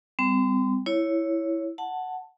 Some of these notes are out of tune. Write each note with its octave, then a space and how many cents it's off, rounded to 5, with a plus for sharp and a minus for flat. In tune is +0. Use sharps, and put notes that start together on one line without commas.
G3 +15 C4 -35
E4 +0 C#5 +0
F#5 +0 A5 +5